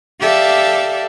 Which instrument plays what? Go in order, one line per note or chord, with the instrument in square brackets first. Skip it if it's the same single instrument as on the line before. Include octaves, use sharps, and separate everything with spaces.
[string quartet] G4 A4 D5 E5 F5